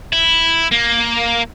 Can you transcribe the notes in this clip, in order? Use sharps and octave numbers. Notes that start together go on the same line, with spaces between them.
E4
A#3